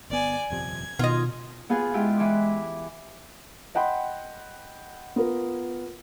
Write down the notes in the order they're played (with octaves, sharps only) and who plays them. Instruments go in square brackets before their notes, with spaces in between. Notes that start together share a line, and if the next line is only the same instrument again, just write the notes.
[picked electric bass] G1 B3 [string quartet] D5 G#5
[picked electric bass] D#1 F2 C3 [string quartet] G#6
[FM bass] B2 [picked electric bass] D#3 [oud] F4 D#5
[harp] B3 F4 G#4
[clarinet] G#3 [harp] E4 F4 G4
[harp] E3 D6
[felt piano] D#5 F#5 G5 B5 C6
B3 F4 A#4